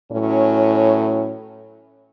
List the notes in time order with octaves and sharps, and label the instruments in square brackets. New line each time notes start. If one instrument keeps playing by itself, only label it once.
[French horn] A2 [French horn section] E3 F#3 C#4